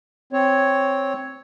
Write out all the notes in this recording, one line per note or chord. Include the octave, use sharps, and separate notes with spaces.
C4 C#5